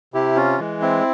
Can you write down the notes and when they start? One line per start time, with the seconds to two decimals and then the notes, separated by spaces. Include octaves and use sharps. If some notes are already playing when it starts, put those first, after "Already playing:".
0.14 C3 E4 G4
0.36 C#4 F4
0.58 E3 G#3
0.81 C4 E4